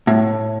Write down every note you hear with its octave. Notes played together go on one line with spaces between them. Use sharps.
A2